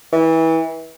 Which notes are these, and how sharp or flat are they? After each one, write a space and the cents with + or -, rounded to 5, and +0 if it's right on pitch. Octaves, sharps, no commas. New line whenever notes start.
E3 -25